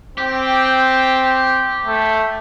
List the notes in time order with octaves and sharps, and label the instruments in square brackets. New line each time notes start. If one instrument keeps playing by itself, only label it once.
[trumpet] C4 [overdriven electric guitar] G4
[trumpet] A3